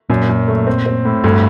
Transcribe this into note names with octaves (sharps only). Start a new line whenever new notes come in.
F#2 A#2
F#2
A3
C4
C4
A2
D2 G2